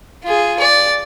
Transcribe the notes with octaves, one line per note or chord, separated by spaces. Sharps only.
F4 G#4
D5